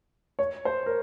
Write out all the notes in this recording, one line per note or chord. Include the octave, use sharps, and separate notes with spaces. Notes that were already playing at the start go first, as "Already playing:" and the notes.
C#5
C5
A#4